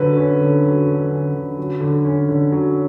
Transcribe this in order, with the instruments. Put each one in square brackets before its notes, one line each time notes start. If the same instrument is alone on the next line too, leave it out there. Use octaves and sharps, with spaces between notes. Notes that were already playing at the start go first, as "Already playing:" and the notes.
Already playing: [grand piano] D3 F#3 B4
C#4
D3
F#3
D3
C#4
D3
F#3
D3
C#4
D3
F#3